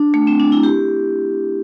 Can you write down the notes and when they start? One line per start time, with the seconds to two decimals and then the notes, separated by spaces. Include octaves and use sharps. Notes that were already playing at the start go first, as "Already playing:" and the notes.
Already playing: D4
0.14 A3
0.27 C4
0.40 D4
0.52 E4
0.63 G4